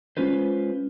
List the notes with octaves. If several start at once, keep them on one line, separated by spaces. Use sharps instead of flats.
G#3 C#4 F4 B4 C5